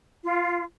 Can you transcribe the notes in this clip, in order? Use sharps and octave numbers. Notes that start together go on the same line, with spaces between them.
F4